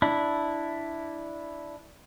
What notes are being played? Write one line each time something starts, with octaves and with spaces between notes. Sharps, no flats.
D4 E4